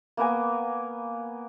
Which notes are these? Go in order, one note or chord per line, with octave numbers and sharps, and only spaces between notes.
A#3 B3 A#4 G#5